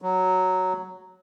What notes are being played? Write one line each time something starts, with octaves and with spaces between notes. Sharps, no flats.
F#3